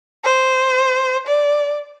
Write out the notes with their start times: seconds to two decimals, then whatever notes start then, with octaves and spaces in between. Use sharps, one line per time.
0.24 C5
1.27 D5